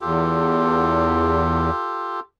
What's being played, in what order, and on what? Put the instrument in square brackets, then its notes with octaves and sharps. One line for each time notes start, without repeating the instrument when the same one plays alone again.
[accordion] E2 [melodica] F4 G4 A4